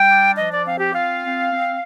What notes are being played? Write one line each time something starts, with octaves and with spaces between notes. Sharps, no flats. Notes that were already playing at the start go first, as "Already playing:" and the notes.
Already playing: G3 G5
D4
F3 D#5
D5
C4 F5
G4
F4 F5
C4
C4